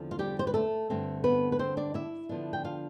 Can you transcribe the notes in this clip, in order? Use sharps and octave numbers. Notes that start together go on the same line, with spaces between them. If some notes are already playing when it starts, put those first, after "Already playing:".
Already playing: E2 D3 F3 C4
F4
G3 G4
C5
B4
A3 A4
G2 D3 A3 C4
B3 B4
B4
C4 C5
D4 D5
E4 E5
D3 F3 B3 D4
G5
F4 F5